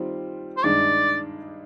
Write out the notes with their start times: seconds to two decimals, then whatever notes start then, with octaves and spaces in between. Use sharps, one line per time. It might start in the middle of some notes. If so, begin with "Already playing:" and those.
Already playing: D#3 G3 C4 F4
0.57 C5
0.64 G2 D#3 G#3 D4 D5